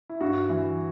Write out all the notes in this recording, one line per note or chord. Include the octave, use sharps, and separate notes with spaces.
E4
G2 F#4
E3